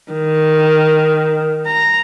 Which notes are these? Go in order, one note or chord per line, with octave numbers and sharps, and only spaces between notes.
D#3
A#5